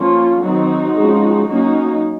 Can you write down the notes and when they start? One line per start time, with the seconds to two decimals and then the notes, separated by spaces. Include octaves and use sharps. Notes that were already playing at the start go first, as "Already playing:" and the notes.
Already playing: F3 A#3 C#4 F4
0.43 D#3 F#3 C4 D#4 F#4
0.95 F3 G#3 C#4
1.47 F#3 A#3 C#4 D#4 F#4